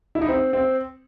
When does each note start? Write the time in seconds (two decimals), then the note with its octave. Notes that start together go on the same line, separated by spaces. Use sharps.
0.15 E4
0.21 D#4
0.29 C4
0.53 C4